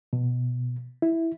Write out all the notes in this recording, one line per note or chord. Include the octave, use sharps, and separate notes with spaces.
B2
E4